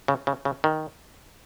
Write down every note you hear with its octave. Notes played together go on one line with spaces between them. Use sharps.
C#3
C#3
C#3
D#3